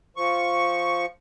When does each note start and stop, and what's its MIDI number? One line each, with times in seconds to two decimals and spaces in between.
0.17 1.06 53
0.17 1.06 85